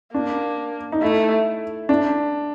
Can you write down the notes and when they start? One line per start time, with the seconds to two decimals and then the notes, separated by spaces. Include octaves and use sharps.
0.14 A#3 D4
0.92 D#4
1.01 A3 E4
1.89 D4